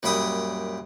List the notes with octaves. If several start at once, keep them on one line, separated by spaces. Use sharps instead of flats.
F#2 A#2 G3 B5 D#6